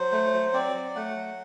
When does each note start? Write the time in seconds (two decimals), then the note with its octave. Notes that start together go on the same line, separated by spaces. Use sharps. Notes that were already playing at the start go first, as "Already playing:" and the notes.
Already playing: F#3 C5
0.12 A3
0.33 F#3
0.53 C4 D5
0.75 F#3
0.95 A3 F#5
1.16 F#3